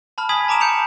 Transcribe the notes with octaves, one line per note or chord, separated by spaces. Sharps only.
A5 B5 F6
G#5 B5 D#6 G#6 B6 F#7
A5 A#5 D6 D7 E7
G6 C#7 E7 F7